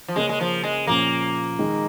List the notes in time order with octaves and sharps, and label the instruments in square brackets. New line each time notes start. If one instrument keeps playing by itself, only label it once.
[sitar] F3
[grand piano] C#3 A#3 C#4 [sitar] G#3
[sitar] G#3
F3
G#3
[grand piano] A#2 F3 C#4 [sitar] A#3
[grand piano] D#3 G#3 D#4